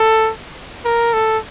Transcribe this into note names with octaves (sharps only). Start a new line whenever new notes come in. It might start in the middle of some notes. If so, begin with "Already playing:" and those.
Already playing: A4
A#4
A4